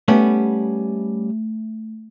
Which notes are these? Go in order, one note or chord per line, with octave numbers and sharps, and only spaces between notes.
G3 A3 B3 C#4